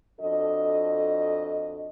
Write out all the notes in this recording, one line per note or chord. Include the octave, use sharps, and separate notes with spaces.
F2 D4 F#4 A4 D#5